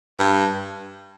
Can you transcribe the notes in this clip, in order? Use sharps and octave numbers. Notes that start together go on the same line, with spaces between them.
G2